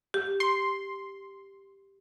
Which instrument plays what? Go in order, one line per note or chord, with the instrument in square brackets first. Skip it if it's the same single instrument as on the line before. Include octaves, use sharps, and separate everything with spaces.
[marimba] G4
[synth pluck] C6